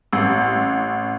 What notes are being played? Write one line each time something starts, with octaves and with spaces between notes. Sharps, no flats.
A1